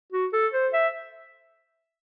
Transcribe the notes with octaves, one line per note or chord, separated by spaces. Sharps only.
F#4
A4
C5
E5